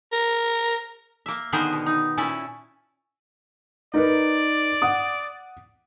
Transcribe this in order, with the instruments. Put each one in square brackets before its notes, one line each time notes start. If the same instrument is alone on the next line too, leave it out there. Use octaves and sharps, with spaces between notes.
[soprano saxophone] A#4
[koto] A#3 E5
D3 D#3 B3 G#4 A#4 C5
B2
D#4
A#2 C#4 E4 A5
[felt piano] D#4 A#4 B4 [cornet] D5
[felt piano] F#5 D#6